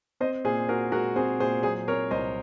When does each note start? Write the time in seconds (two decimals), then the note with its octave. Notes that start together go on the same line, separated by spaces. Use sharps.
0.20 C4 C5 D#5
0.45 A#2 G#4 C5
0.68 A#2 F#4 A#4
0.92 G#3 F#4 A#4
1.16 C4 G#4 C5
1.40 A#2 G#4 C5
1.63 F#3 G#4 C5
1.88 C4 A#4 C#5
2.11 C2 C5 D#5